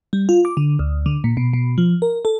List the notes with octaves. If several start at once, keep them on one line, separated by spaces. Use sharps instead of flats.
G3
F4
D6
D3
D2
D3
A#2
B2
B2
F3
A#4
A4